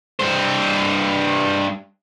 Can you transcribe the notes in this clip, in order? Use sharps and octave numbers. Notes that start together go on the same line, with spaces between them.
G2 C5